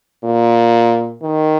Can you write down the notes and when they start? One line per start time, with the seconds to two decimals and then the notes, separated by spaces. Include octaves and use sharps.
0.24 A#2
1.22 D#3